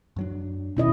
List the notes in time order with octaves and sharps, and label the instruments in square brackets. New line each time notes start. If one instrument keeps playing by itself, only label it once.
[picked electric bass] F#2 F#3 D4
[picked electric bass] G#1 D#2 C#4 [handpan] B2 E4 D#5